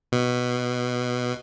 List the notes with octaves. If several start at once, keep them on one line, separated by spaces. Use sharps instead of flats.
B2